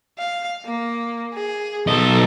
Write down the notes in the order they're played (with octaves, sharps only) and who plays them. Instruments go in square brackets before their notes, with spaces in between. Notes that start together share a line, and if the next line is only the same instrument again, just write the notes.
[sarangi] F5
A#3
G#4
[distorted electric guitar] B1 D#5 [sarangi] A4